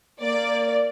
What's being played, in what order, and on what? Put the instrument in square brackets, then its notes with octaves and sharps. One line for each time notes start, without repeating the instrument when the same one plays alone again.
[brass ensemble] A#3 [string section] D5